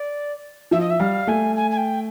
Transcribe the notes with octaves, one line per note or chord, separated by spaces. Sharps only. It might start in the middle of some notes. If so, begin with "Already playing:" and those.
Already playing: D5
F3 E5
D#5
E5
G3 F5
A3 G#5
G#5
G#5
G5